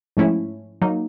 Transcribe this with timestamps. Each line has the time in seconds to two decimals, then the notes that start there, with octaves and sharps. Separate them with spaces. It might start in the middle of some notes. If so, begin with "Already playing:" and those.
0.17 G#2 F3 A3 C#4 E4
0.82 F#3 A#3 D#4